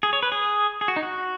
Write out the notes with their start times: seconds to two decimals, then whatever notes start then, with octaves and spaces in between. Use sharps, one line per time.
0.03 G#4
0.13 C#5
0.23 B4
0.32 G#4
0.81 G#4
0.88 F#4
0.96 D#4
1.03 F#4